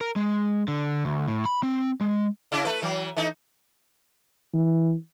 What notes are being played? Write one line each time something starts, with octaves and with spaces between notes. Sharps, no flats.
A#4
G#3
D3
D2
A2
B5
C4
G#3
C#3 E4
A3 B4
E3 F#3
E3 A3 D#4
E3